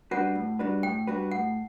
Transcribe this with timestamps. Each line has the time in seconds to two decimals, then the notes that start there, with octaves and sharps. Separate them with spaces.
0.11 G3 D4 F#4 B4 F#5
0.35 A2
0.59 G3 D4 F#4 B4
0.83 A2 G5
1.07 G3 D4 F#4 B4
1.31 A2 F#5